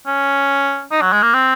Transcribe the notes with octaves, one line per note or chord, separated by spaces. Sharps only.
C#4
D#4
F#3
G#3
A#3
C4